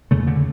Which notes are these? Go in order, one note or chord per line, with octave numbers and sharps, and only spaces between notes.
E2 C#3 A3
D3